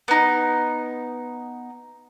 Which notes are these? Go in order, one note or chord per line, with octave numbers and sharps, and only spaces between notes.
B3 D#4